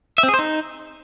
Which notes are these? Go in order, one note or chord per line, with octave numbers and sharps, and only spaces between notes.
E5
C4
G#4
C5
D#4